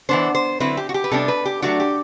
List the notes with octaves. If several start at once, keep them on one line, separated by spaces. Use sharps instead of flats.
E3 B3 D4 C5
C5
D3 F#3 C4 E4 B4
G4
F#4
G4
B4
C3 G3 B3 D4 A4
B4
G4
F#3 A3 D4 F#4
G4